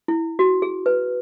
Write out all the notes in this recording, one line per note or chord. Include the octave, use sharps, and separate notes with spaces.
E4
F#4
G#4
B4